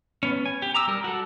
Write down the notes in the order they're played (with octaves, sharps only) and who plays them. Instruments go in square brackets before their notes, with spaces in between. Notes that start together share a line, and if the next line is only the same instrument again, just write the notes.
[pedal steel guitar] B3 C#4
G#5
G4
A#5 D6 E6
G3 A#4
F#4 A4